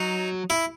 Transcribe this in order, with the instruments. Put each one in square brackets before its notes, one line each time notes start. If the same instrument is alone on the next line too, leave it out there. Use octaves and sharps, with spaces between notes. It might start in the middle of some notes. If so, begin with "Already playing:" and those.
Already playing: [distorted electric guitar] F#3 [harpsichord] D#4
[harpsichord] E4